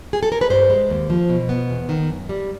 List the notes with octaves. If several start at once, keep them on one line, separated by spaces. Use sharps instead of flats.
G#4
A4
A#4
B4
G2 C5
G#3
D#2
F3
B2
B3
E2
D#3
F#2
G3